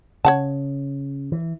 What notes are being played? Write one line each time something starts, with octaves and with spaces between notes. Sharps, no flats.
C#3 C#5 F#5 A5
E3